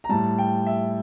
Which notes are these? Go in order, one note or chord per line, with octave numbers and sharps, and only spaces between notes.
A#5
A2 G3 A5
G5
E5